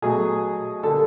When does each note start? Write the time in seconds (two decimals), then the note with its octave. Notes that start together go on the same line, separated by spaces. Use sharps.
0.02 B2 F#3 A3 G#4
0.83 D3 G3 A#3 A4